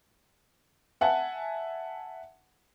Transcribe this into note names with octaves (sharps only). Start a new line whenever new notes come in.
E5 F#5 G#5 A5